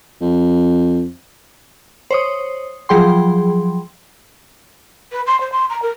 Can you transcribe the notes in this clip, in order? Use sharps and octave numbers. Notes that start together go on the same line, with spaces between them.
F2
C5 C#5 D#6
F3 F#3 G#4 G5 C6
B4
C6
C5
C6
A#5
A#4